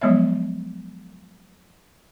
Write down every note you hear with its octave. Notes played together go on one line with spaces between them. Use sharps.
F3 F#3 G#3 B3 C#5 E5